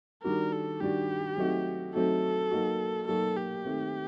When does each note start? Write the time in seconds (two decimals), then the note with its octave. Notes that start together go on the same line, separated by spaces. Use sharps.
0.23 D#3 G3 D4 F#4 A#4
0.52 A4
0.81 D#3 G3 D4 F#4 G4
1.37 F#3 A3 C4 D#4 F#4
1.94 F#3 A3 C4 D#4 F#4 A4
2.51 F#3 A#3 D#4 F#4
3.07 F#3 A#3 D#4 F#4 A4
3.37 G4
3.65 D#3 A3 C4